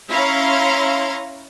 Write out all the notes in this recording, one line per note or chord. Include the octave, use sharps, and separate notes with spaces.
C#4 E4 C#5 F5 A#5 C6